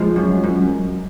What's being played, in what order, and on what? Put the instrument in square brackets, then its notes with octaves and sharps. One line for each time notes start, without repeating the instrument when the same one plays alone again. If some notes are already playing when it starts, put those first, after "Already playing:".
Already playing: [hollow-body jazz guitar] F3 G#3
F#2
F#2